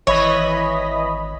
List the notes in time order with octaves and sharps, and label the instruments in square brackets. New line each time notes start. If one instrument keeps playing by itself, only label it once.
[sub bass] G#1 [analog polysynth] E3 D#5 B5 [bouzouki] C#5